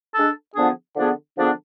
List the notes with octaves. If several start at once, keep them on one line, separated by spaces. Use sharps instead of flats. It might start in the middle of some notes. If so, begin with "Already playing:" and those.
G#3 D4 A4
D3 F3 B3 D4 G#4
D3 F3 B3 D4 G#4
D3 F3 B3 D4 G#4